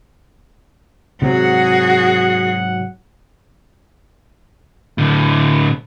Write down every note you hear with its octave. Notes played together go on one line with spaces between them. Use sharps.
G#2 C3 F#3 F#4 G#4 F#5
A2 D3